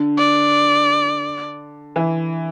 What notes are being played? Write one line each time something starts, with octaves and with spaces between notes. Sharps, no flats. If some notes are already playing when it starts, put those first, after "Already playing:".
Already playing: D3
D5
E3